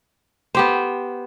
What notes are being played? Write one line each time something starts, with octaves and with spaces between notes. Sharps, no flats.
B3 G4 C5